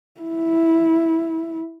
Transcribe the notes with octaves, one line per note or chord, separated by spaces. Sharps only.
E4